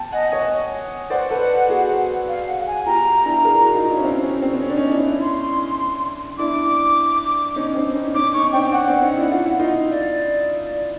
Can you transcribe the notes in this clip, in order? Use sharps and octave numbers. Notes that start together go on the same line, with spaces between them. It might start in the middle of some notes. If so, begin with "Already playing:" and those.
Already playing: G5 A5
D#5 F#5 G#5
C#5 D#5
C5 D5 F#5
A4 B4
F#4 G#4
F5
F#5
G#5
F4 G4 A#5
D4 E4
G#4 A#4
E4 F#4
D#4 F4
D4 E4
C#4
C4 D4
C#4
C4
C4
C#4
D4
C#4 D#4
D4 E4
D4 E4
C6
D4 E4 D6
C#4 D#4
C4 D4
C#4 D#4
C#4 D#4 D6
C#4 D#4 C#6
C4 D4 G5
F#5
C4 D4
C#4 D#4
D4 E4
F4
E4
D#4 F4
D5